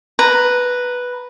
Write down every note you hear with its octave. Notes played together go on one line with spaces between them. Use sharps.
B4 A#5